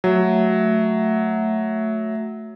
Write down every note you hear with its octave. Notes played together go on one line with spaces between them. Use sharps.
F#3 A3 E5